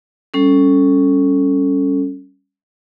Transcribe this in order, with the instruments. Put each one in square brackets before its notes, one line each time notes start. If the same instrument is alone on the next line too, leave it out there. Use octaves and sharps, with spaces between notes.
[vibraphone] G3 C#4 A4